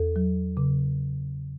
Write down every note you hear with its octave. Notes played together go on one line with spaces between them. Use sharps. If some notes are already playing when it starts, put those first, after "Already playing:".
Already playing: E2 A4
F#3
C#3